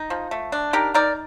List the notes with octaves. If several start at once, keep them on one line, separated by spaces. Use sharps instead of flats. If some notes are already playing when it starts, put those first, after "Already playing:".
Already playing: D#4
F3
A3
D4
D#4 G4 A#4
D#4 A#4 D5